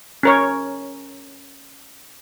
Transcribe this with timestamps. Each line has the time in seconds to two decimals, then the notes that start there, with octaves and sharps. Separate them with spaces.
0.23 C#4 A#4 C#5